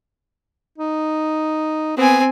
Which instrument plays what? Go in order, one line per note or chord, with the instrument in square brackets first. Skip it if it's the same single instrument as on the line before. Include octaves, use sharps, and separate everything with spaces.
[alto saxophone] D#4
[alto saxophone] B3 [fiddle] C4 G#5